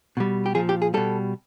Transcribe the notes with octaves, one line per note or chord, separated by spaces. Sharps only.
B2 G3
G4
A#2 F3 G#4
G4
G#4
B2 G3 A4